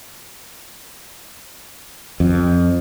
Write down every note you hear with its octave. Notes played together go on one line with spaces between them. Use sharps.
F2